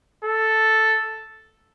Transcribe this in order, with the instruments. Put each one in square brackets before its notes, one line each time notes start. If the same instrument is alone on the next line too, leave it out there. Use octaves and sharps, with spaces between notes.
[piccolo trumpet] A4